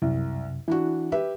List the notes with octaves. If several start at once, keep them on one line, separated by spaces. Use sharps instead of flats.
C2 F#2 C3
E3 D4 E4 F#4
G4 B4 E5